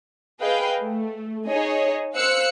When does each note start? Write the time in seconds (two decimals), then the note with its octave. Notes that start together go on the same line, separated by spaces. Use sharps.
0.41 G#4 B4 D#5 F5 G5
0.81 A3
1.48 D#4 G#4 C#5 D#5
2.14 C5 F5 E6 F#6 C#7